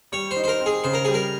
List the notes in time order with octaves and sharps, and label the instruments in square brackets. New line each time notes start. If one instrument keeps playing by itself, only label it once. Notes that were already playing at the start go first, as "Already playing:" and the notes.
[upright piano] G3 [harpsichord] C#5
[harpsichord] C5
[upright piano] D#4
[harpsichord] C5
A#4
[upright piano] C4
[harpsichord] G#4
[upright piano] C#3 [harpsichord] C5
[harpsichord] A#4
[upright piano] G3 [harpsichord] G#4
[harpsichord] A#4